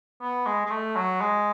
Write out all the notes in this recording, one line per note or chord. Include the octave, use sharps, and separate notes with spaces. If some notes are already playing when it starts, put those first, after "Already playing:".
B3
G#3
G#3
A3
F#3
G#3